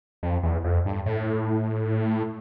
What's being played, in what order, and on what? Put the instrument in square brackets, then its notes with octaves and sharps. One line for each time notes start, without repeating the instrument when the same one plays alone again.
[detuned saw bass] F2
E2
F2
G2
A2